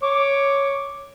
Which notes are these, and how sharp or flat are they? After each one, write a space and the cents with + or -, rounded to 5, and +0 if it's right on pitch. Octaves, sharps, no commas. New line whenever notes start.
C#5 +0 D6 +0